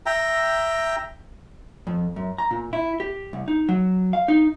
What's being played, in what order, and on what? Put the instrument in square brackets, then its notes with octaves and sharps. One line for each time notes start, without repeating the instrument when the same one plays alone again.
[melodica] E5 G5 A#5
[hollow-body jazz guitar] F2
F#2
A#5
A#2
E4
G4
C2
D#4
F#3
F5
D#4